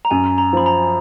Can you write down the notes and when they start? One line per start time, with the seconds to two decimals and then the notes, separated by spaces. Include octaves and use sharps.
0.05 A#5
0.11 F#2 G#5
0.38 A#5
0.53 F3 B5
0.66 A#5